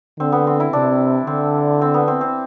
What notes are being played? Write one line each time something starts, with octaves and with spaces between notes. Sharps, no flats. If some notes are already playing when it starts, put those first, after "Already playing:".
D3 C4
B3
C4
E4
C3 D4
D3 C4
C4
B3
C4
C4